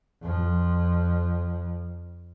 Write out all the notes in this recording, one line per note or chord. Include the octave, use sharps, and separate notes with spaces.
F2 F3